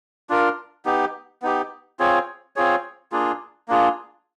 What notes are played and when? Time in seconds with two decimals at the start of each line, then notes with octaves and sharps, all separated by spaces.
0.30 D4 F4 A#4
0.85 B3 D#4 G4
1.42 B3 D#4 G4
1.99 C4 F4 G#4 C#5
2.56 C4 F4 G#4 C#5
3.12 A#3 D4 F4 G#4
3.68 A#3 D4 F4 G#4